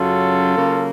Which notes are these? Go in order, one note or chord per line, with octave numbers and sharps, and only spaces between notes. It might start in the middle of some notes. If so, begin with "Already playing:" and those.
Already playing: F#2 C#3 F#3 F4 A4
C#3 F#3 A#3